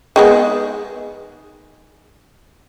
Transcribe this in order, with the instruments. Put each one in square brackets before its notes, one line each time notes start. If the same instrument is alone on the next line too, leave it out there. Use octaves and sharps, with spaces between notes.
[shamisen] D#3 G#3 B3